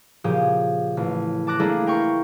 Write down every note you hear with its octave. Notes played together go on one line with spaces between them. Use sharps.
A#2 C#3 F3 G4 G#4
A1
A5 D6 F#6 A#6
A3 A#3 D4 E4 G#4 A4
A#4 G5 C6 C#6